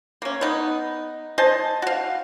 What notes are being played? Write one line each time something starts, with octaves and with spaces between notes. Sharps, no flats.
A#3 C#4
B3 D#4
C5 D#5 G#5 A5
F#4 F5